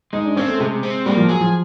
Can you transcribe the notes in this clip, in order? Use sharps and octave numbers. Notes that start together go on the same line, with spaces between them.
G#3 D#4
D4
C4 C#4
A3
C3 G#3
C4
G3 A#3
F3
F#3 G#4
F3